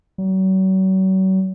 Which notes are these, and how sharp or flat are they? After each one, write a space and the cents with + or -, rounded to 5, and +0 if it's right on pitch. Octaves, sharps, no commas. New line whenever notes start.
F#3 +40